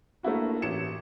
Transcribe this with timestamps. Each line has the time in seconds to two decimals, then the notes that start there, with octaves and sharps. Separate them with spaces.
0.23 A3 A#3 D4 E4 F#4
0.62 A1 C#7 E7